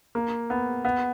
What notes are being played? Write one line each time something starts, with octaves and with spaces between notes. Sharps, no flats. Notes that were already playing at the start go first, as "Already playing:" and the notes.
A#3
B3
B3